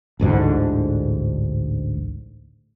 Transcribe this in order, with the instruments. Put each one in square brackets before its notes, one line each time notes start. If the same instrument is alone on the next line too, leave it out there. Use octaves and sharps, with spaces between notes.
[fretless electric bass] A1 D2 G#2 D3